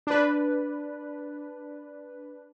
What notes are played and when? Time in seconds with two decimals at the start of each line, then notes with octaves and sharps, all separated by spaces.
0.07 D4 B4